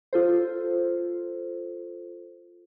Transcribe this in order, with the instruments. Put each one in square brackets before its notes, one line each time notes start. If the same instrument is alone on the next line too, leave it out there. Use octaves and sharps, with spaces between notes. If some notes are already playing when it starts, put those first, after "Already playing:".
[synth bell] F4 A4 C5